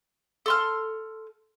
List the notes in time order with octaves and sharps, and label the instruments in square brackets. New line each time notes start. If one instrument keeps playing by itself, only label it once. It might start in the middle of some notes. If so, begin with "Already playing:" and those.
[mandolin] A4 C6 F6